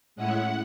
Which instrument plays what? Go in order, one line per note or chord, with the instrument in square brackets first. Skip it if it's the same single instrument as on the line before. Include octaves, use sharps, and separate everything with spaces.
[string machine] A2 G#3 C#4 E4 F#5